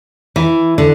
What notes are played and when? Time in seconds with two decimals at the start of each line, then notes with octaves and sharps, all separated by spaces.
0.36 E3
0.78 D3